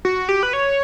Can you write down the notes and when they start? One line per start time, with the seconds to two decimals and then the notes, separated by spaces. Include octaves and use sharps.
0.05 F#4
0.29 G4
0.43 B4
0.53 C#5